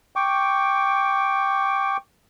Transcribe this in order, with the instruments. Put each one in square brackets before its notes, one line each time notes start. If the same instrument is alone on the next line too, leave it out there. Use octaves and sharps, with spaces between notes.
[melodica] G5 C#6 D6